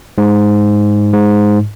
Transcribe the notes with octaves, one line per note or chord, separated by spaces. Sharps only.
G#2
G#2